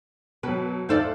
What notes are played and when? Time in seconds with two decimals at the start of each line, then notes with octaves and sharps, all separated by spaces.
0.43 B2 F#3 B4
0.89 E2 A3 D#4 A4 C5 D5 F5